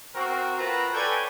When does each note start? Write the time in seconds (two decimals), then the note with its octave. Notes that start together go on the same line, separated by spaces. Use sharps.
0.15 C4 F#4 A#4
0.59 C4 F4 F#4 B4 A#5
0.93 A4 B4 C#5 D5 G5 G#5